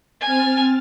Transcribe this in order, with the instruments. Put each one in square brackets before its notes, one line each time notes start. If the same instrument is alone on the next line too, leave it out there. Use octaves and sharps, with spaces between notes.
[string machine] C4 F6 A6 [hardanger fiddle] G#5